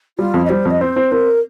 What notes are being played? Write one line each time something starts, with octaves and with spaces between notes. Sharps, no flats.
G3 F4
F2
D#5
G3 C5
F2
D#5
C4 C5
C4
C4 A#4